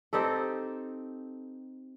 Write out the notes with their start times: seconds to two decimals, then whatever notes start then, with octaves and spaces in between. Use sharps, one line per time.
0.13 C4 D#4 G4 A4